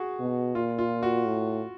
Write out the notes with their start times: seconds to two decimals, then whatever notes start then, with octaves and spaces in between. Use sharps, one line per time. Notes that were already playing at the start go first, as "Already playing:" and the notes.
Already playing: F#4 G#4
0.19 B2
0.55 A#2 F4
0.78 F4
1.03 F#4
1.26 A2